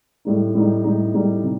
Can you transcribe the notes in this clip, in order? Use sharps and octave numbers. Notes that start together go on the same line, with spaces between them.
A2 G3 D#4
A2 G3 D#4
A2 G3 D#4
A2 G3 D#4
C3